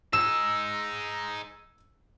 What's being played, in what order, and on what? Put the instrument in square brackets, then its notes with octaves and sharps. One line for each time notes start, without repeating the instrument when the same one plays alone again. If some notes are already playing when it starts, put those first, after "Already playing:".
[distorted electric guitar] D#4 G#4 [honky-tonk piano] E6 E7